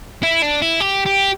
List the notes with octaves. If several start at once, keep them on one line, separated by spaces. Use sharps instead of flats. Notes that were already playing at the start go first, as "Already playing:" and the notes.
E4
D4
E4
G4
G4